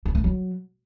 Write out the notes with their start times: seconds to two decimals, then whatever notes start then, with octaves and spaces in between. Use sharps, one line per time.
0.05 C#4
0.15 A3
0.24 F#3